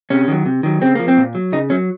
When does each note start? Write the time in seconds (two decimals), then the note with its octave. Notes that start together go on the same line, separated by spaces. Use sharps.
0.10 C3 C#4
0.28 D#3 F#3
0.46 C3
0.63 D#3 F#3
0.81 C#3 C4
0.95 F3 A#3
1.08 C4
1.17 A#2
1.35 F#3
1.52 C#3 D#4
1.70 F#3 C#4